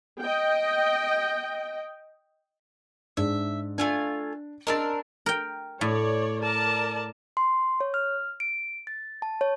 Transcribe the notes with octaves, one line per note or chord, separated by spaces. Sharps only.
D#5 G5
G#2 D4 E5
A3 D4 F4 G#5
C4 D4 A#4 D#5 E6 A6
A#4 G5
A2 C#5 D5
A#4 D5 A5
C6
C#5
F6
D7
A6
A5
C#5